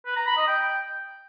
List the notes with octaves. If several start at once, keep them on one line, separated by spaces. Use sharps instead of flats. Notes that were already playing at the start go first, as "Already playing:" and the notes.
B4
A#5
B5
D#5
G5